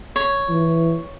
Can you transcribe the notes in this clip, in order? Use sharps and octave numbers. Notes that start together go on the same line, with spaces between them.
C#5
E3